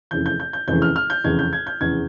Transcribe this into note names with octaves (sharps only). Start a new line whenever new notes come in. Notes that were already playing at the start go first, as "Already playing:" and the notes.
F1 E2 C#3 E3 G6
G6
G6
G6
F1 E2 C#3 E3 G6
F6
F6
G6
F1 E2 C#3 E3 G#6
G6
G#6
G6
F1 E2 C#3 E3 G#6